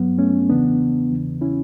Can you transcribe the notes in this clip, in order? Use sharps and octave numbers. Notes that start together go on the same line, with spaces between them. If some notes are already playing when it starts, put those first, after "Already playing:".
Already playing: G2 F#3 B3
A3 C#4
E2 C#3 E3 B3 D4
E2 C#3 E3
C#4 E4